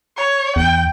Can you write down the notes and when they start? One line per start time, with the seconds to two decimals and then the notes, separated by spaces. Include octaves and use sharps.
0.17 C#5
0.56 E2 G5